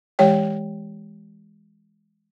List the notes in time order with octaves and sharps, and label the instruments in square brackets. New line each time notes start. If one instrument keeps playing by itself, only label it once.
[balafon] E3 G#3 G4 C#5 G5